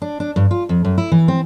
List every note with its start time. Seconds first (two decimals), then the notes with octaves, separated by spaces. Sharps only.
0.02 D4
0.20 D4
0.36 G2
0.51 F4
0.69 F2
0.85 F#2
0.98 E4
1.12 E3
1.28 C4